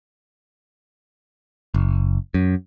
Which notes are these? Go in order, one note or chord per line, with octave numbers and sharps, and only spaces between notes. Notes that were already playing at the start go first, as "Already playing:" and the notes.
F#1
F#2